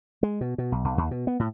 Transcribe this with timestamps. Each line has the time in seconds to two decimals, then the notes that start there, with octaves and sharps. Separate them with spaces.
0.23 G#3
0.41 B2
0.58 B2
0.72 B1
0.84 B1
0.98 D#2
1.11 B2
1.27 B3
1.39 A2